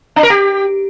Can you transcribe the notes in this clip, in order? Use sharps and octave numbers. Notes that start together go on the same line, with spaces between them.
D4
A#4
G4